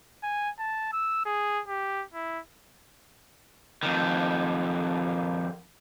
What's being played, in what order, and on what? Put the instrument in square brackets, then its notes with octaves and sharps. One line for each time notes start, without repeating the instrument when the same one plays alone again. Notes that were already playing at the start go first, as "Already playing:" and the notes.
[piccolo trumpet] G#5
A5
E6
G#4
G4
E4
[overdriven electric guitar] F2 D#3